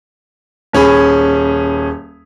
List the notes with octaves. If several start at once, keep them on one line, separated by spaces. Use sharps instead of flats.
D#1 C#4 G#4 B5